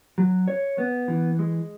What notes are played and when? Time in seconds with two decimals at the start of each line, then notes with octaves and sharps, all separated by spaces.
0.18 F#3
0.48 C#5
0.78 B3
1.08 E3
1.39 G#3